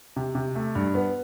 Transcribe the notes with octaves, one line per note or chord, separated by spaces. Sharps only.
C3
C3
A3
G2
B3